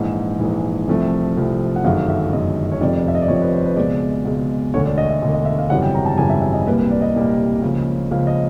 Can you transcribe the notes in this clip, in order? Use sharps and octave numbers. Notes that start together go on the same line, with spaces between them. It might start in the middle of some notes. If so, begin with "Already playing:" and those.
Already playing: A#1 G#2 E3
A#1 G#2 E3
C2 C3 F3 A3
C2 C3 F3 A3
F#5
G1 F#2 D#3 G#3 F5
E5
G1 F#2 D#3 G#3 D#5
C#5
F1 F2 C3 F3 D5
E5
D#5
D5
F1 F2 C3 F3 C#5
B4
C5
B4
C#2 B2 G#3 D5
C#2 B2 G#3
E1 D2 D3 C#5
D5
D#5
E5
E1 D2 D3
D#5
E5
F5
G#1 F#2 C#3 E3 G3 F#5
G5
A#5
A5
G#1 F#2 C#3 E3 G3 G#5
E5
E5
D#5
C2 A#2 G3 A#3 B4
B4
D5
D#5
C2 A#2 G3 A#3
C#2 C#3 F3 A#3
C#2 C#3 F3 A#3 F5
D#5